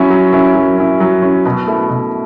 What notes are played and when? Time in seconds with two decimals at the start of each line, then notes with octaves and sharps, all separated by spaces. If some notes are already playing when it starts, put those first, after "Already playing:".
Already playing: F#3 C#4 E4
0.10 F#3
0.33 C#4 E4
0.55 F#3
0.78 C#4 E4
1.00 F#3
1.22 C#4 E4
1.45 B2
1.68 A3 E4
1.90 B2